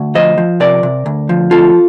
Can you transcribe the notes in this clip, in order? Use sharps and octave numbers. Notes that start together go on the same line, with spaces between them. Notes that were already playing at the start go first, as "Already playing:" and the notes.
Already playing: D2
F3 C5 D#5
F3
C3 A#4 D5
C3
D2
F3
D2 F4 A4